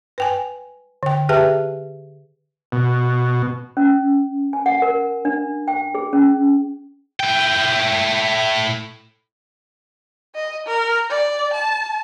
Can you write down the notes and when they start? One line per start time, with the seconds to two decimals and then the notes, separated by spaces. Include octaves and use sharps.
0.18 B4 G5 G#5
1.03 D3 G5
1.29 G4 G#4 B4 E5 G5 A5
2.72 B2
3.77 C#4
4.53 G#5
4.66 F#5
4.82 A#4
5.25 D4
5.68 G5
5.95 G#4
6.13 C#4
7.20 A2 G5
10.35 D#5
10.67 A#4
11.10 D5
11.53 A5